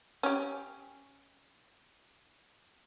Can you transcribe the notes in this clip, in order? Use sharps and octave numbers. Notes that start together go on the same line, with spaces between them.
C#4 G4